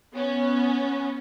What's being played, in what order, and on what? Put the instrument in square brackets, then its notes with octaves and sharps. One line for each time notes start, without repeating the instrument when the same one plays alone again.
[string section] B3 C#4